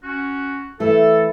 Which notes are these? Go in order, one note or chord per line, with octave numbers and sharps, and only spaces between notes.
C#4 F#4
E3 A3 A4